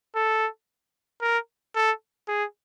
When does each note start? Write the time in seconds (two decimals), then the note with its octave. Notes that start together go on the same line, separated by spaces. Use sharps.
0.15 A4
1.22 A#4
1.75 A4
2.28 G#4